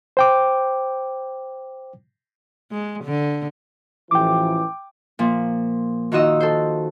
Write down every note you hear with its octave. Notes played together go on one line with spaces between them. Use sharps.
C5 G5 D6
G#3
D3
A1 E3 F3 G5 D6
A#2 F3
D#3 F4 F#4 D#5 E6
A4 C5